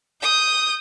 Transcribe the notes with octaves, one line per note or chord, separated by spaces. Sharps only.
D#6 G6